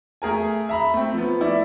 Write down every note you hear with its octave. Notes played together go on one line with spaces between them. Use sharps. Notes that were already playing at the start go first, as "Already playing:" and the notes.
A3 G#4 A#4 G#5
E5 A#5 B5
A3 C4
F3 B3
A3 E4 D5